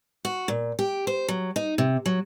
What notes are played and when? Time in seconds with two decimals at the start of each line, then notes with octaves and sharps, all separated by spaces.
0.25 F#4
0.48 A#2
0.79 G4
1.07 C5
1.28 F#3
1.56 D#4
1.78 C3
2.06 F#3